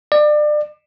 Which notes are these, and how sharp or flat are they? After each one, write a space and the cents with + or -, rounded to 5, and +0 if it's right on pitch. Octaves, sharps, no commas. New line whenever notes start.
D5 +30